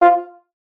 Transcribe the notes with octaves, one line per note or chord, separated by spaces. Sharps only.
F4